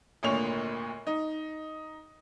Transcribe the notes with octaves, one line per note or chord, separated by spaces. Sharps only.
G#1 D2 A#2 C#5 F7
D#4